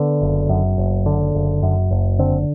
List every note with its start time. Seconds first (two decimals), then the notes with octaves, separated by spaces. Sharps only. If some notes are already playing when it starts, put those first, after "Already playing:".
Already playing: D3 B3
0.22 F#1
0.49 F#2
0.78 F#1
1.06 D3
1.35 F#1
1.63 F#2
1.91 F#1
2.19 D3 C4